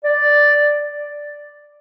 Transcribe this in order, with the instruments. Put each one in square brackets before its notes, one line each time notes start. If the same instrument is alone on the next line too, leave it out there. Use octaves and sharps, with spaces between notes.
[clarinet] D5